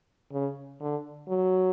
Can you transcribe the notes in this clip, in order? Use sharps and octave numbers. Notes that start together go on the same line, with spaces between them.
C#3
D3
F#3